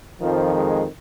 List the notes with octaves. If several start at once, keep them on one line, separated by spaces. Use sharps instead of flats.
F2 D#3 F3
G#3